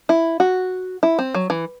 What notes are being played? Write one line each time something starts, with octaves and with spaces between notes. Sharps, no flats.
E4
F#4
E4
C4
F#3
E3